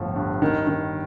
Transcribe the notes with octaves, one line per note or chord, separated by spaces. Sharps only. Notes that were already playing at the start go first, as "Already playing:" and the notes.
Already playing: G1 A2 F3
G2
D#3
D#3